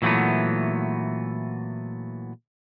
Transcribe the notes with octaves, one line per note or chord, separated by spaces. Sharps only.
A#2 E3 F#3 G3 A3 B3